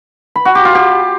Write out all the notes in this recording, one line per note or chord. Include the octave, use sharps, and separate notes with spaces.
B5
F#4
G4
F4
G4